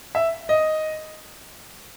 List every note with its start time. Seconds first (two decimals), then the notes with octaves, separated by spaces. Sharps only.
0.15 E5
0.49 D#5